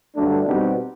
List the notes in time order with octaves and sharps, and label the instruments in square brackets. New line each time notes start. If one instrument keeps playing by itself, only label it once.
[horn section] G2 D3 F#3 A3 D4
B2 G3 C4 D#4 F#4